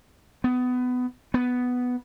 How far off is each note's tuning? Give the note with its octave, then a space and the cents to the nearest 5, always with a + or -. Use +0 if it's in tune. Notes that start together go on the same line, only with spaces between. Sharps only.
B3 +20
B3 +5